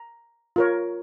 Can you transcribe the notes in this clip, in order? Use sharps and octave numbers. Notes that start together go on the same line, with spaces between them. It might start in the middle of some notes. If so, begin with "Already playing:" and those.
Already playing: A#5
F4 A#4 C#5